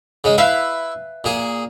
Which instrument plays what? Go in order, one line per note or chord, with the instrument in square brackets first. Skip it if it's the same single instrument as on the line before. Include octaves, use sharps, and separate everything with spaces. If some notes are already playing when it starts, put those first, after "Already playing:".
[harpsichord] C#3 G#3
[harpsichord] E4 [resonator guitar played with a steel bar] B4 E5 F5
[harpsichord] A#2 G#4